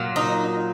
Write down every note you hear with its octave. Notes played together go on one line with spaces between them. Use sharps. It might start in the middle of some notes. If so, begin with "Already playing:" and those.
Already playing: A#2 F#3
D#4